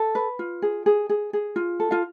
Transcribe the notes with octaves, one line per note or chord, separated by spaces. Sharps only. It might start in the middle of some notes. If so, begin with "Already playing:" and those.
Already playing: A4
B4
F4
G#4
G#4
G#4
G#4
F4
A4
F4 F5